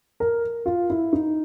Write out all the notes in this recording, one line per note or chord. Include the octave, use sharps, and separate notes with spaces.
A#4
F4
E4
D#4